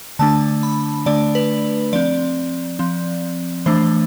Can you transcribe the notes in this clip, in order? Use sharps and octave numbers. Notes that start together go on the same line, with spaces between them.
D3 A3 D4 A5
B5
D3 A3 D4 D5
B4
F3 C4 D5
F3 C4
E3 A3 D4 C5